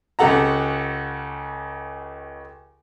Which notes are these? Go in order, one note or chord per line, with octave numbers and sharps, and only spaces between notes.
C#2 C#3 G4 A4 F#5 A#5